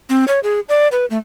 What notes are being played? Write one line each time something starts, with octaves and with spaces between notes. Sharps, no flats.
C4
C#5
G#4
D5
B4
A3